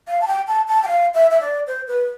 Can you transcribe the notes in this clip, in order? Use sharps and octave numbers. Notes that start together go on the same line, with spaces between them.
F5
A5
G5
A5
A5
G5
F5
E5
E5
D5
C5
B4